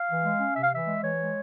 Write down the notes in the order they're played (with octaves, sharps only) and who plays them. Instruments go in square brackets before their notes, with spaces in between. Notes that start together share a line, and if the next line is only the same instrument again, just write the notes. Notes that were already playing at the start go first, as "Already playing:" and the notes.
Already playing: [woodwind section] F5
E3
G#3
C#4
C3 E5
F5
E3 E5
G#3
E3 C#5
G#3